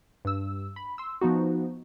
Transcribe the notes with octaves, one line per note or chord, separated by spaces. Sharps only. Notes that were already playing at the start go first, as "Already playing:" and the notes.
G2 E6
B5
C6 E6
F3 B3 D#4 F#4